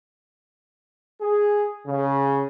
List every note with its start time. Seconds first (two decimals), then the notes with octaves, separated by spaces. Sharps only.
1.21 G#4
1.87 C#3